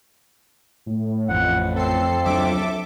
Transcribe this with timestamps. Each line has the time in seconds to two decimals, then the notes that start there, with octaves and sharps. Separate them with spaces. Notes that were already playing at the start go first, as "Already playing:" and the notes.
0.86 A2
1.29 A1 F2 F#5
1.76 C4 A4 C7
2.25 C#2 F#3 D4 A4 E5 D6